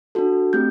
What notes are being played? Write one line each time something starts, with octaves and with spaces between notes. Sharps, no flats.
D4 F#4 A4
A3 C4 G4 G6